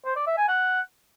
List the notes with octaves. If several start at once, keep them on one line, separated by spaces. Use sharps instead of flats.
C5
D5
E5
G#5
F#5